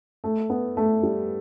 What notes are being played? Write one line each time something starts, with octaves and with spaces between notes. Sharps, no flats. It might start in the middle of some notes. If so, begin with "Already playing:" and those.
A3
B3
A3
G3